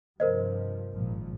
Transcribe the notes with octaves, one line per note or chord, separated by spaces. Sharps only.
G2 C3 F3 A#4 C5 D#5
G#1 A#2 F3